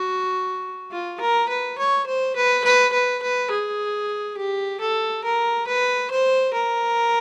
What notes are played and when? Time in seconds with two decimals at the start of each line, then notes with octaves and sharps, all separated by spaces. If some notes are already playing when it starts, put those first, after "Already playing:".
Already playing: F#4
0.91 F4
1.20 A#4
1.49 B4
1.78 C#5
2.07 C5
2.36 B4
2.64 B4
2.93 B4
3.22 B4
3.51 G#4
4.37 G4
4.81 A4
5.24 A#4
5.67 B4
6.11 C5
6.53 A#4